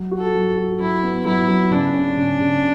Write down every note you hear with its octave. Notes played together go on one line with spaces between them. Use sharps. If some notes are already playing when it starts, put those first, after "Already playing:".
Already playing: F#3
F#4
A4
F#3
F#4
F#3 E4
B3
F#3 E4
F#3
C#3 D4
C#4
C#3
C#3